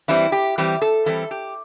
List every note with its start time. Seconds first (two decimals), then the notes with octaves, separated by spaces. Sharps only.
0.08 E3 G3 C4 E4
0.32 G4
0.58 E3 G3 C4 G4
0.82 A4
1.06 E3 G3 C4 A4
1.31 G4